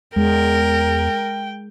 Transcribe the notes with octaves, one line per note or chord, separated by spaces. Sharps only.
E2 G#3 A#4 G5